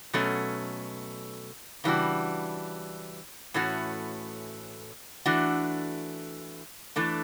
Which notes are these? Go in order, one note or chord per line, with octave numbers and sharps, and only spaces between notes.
B2 F#3 A3 C#4
C#3 E3 G3 D4 F#4
A2 E3 A3 C#4 F#4
E3 A3 D4 F#4
E3 A3 D4